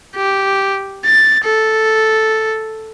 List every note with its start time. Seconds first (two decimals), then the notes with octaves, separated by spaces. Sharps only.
0.16 G4
1.06 A6
1.45 A4